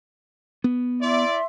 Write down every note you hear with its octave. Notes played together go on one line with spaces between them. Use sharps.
B3
E4 D5 E5 C6